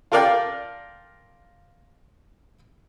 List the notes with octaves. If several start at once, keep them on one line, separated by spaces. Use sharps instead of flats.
F4 A4 A#4 D5 F5 G5